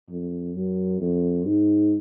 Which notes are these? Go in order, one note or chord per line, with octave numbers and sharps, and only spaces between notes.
F2
F#2
F2
G#2